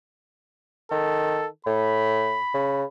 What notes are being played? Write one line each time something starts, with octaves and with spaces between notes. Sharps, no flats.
D#3 A4
A2 B5
C#3